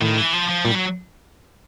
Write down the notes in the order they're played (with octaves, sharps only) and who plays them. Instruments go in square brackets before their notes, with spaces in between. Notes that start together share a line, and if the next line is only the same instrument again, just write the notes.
[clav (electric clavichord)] A2 [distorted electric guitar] D#3
[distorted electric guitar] E3
F3
F3
[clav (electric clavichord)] A#2 [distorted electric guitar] G3
[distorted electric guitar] F#3